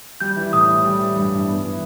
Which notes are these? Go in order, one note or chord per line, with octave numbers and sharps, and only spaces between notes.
G3 G6
E3
A2 D#6
A2
G3
E3
G2
G2
B3
E3